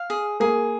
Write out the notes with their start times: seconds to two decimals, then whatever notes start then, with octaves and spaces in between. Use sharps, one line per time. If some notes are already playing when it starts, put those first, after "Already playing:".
Already playing: F5
0.10 G#4
0.40 A#3 G#4